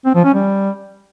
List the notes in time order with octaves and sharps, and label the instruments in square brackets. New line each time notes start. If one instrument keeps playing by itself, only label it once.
[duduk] C4
F3
C#4
G3